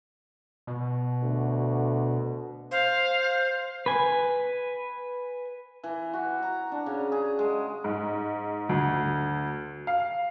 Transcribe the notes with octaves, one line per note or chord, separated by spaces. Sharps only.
B2
D2
C5 F5
B4 G#5
E3
F#4
A#5
D4
C#3
G#4
G#3
G#2
D2
F5